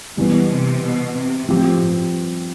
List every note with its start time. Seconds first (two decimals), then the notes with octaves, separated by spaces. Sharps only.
0.17 G2 B2 E3 B3
0.50 C3
0.83 B2
1.16 C3
1.48 A2 F3 C4 G4
1.82 G2